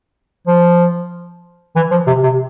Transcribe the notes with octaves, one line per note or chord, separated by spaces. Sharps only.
F3
E3
F3
C3
C3